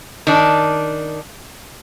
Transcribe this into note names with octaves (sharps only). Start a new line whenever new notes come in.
D#3 D4